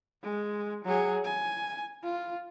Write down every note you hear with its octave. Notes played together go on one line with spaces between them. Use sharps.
G#3
F#3 G#4
G#5
F4